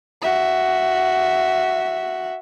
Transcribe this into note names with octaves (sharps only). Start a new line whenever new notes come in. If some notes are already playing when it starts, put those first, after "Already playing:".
F#4 E5